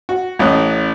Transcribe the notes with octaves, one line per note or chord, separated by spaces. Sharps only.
F#4
A1 C#4 D#5 F#6